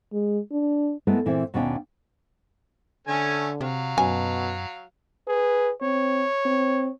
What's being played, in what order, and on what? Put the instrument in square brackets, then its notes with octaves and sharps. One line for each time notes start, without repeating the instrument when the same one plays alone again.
[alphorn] G#3
D4
[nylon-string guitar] G#3 A3 B3 E4 A#4
A#2 E3 C4 E4 E5
D#2 B2 C#4 D4 F5 G5
[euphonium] D3 [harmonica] A3 C#4 G#5
[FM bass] C3 [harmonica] F#3 F5
[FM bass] F#2 [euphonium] B2 [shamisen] G#5
[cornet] G#4 [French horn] B4
[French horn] C4 [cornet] C#5
[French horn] C4